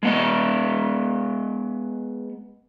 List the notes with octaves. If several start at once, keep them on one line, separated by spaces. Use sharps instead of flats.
G#3 B3 D#5